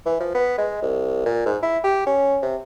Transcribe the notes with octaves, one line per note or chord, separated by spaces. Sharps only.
E3
F3
B3
G#3
C2
A#2
G#2
E4
G4
C#4
C3